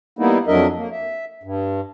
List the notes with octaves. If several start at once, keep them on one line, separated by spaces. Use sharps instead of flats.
G3 A#3 B3 D#4 E4
F2 F#3 D4 A#4 D#5 E5
A#3
E5
G2